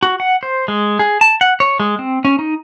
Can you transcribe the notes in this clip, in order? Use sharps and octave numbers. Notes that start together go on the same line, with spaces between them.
F#4
F#5
C5
G#3
G#4
A5
F#5
C#5
G#3
C4
C#4
D#4